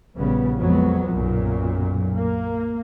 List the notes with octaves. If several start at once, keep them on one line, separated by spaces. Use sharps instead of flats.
A#1 C#3 G3 B3
F2 F#3 G#3 B3
B1 F#2 A#2
A#3